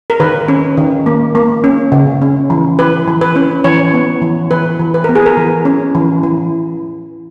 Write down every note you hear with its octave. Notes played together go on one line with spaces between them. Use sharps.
A#4
D#3 B4
C#4
D#3
A#3
A#3
C#4
C#3
C#4
E3
E3 B4
E3
B4
C#4
E3 C#5
B3
E3
E3 B4
E3
B4
B3 A#4
G#4
A#4
E3
C#4
E3
E3